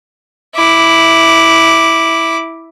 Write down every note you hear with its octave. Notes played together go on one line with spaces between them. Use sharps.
E4 D6